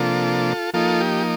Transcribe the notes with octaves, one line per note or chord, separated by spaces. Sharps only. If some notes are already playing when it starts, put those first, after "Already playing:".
Already playing: C3 F3 A#3 D4 F4 A4
F3 A#3 D#4 F4 A4
G4